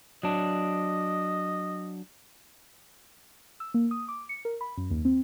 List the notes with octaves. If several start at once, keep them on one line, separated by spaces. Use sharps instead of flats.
F#3 D4 D#5
E6
A#3
D#6
D6
C#7
A#4
B5
F#2
D#2
C4